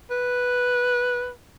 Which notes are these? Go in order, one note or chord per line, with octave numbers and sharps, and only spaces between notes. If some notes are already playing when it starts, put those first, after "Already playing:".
B4